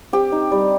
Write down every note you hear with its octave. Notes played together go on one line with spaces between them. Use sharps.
C4 G4
D#4
G3